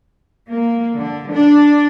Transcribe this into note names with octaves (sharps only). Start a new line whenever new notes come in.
A#3
D3
D4